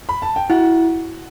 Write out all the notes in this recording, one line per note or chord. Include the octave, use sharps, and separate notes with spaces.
B5
A5
G5
E4 F#4 F#5